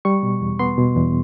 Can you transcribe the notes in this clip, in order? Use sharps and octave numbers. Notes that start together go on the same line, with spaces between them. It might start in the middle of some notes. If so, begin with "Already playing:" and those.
G3 C#6
B2
E2
B3 C6
B2
E2